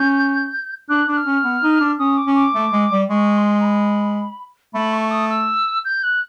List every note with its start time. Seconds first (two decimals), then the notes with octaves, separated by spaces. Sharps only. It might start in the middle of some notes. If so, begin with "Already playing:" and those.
Already playing: C#4 G6
0.89 D4 F#6
1.07 D4 F#6
1.17 F6
1.26 C#4
1.44 B3
1.63 D#4
1.80 D4
1.99 C#4 D#6
2.17 D6
2.26 C#4
2.35 D6
2.54 A3
2.73 G#3
2.91 G3
3.09 G#3 C#6
3.37 C6
3.60 A#5
3.64 B5
4.74 A3 B5
4.93 C#6
5.11 D#6
5.29 E6
5.85 G6
6.03 F#6